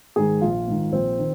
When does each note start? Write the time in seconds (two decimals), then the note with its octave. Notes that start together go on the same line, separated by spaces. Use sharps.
0.16 G#2 D#3 G#4
0.41 A#1 F4
0.68 G#2 D#3
0.92 A#1 C4
1.19 D#3